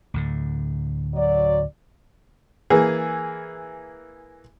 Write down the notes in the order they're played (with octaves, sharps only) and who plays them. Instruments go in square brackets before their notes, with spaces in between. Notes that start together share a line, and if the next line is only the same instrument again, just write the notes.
[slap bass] D2 A2 D3
[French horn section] F#3 D5
[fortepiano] E3 A#3 G#4